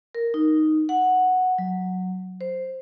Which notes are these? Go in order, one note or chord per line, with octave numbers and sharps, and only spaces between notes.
A#4
D#4
F#5
F#3
C5